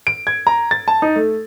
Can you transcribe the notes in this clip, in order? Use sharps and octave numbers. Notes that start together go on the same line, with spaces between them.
D7
G#6
A#5
A6
A5
D#4
A3